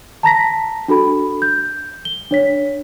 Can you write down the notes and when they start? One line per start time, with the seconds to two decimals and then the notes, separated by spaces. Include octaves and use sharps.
0.23 A5 A#5 A#6 B6
0.88 D4 F#4 A4 B5
1.42 G6
2.05 G7
2.31 D4 C#5 B6